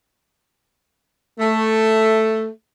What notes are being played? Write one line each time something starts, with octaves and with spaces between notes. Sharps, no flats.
A3